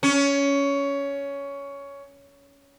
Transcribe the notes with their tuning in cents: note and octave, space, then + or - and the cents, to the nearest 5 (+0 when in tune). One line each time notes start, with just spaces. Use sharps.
C#4 +15